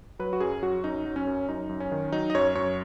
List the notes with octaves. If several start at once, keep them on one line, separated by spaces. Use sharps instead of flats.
F#3 B4
F#4
F#2 G#4
F#3 F#4
F#2 D#4
F#3
C#4
F#2
F#2 D#4
F#2
C#4
D#3
F#3 D#4
D#5
F#2 C#5
F#2 C#5